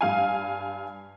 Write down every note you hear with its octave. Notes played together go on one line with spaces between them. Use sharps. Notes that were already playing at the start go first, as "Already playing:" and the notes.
G2 F5 G#5